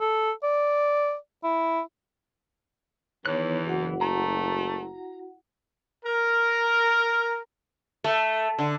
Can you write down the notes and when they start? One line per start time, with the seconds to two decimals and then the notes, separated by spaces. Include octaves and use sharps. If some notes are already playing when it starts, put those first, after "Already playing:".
0.01 A4
0.43 D5
1.44 E4
3.26 E2 D#3 E3 B3 C#5 F#6
3.65 F#1 E4 F#4 F#5
4.01 A3 A#5
6.06 A#4
8.04 A3
8.59 D3